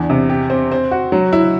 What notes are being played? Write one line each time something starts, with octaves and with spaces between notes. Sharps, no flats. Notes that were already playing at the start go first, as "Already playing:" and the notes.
Already playing: E2 D4
C3
G4
C4
C4
F#4
F#3
E4